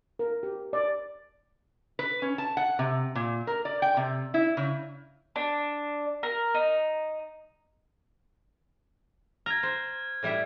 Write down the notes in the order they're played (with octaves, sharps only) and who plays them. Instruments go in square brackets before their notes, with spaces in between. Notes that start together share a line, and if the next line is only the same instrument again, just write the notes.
[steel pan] A#4
G4
D5
[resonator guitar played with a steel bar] B4
C#4
A5
F#5
C3
A#2
A#4
D5
G5
C3
E4
C#3
[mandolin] D4
A#4
D#4
[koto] A#5 [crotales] F6 G#6
[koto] C5
A2 G3 E4